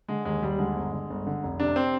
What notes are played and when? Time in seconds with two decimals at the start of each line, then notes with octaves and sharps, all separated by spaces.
0.08 D3 G#3
0.25 D#2 G#3
0.42 D#2 G3
0.59 D3 G#3
0.76 G1
0.92 D3
1.10 G1
1.26 D3
1.43 F1
1.60 C3 D4
1.76 C4